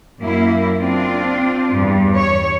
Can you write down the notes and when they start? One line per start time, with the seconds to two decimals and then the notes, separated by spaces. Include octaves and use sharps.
0.22 F#2 A#3 E4
0.78 C4 D4 F4
1.75 E2 G2
2.14 C#5